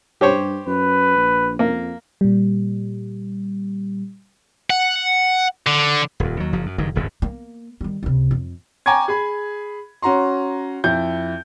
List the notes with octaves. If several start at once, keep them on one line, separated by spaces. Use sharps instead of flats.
G2 G4 C5 C#5
F#2 B4
A#1
F2 A#3
A#2 G3
F#5
D3
D#1 F2
D#2 F#3
F#1 F3 F#3
F#2
F#1 G2 D#3
D#1 G#1 G2 C#3
A#3
D#3 G3
C#2 C3
F2
G5 G#5 A#5 C#6 D6 G#6
G#4 B5
C#4 F#4 A#5 C6
F2 E4 G6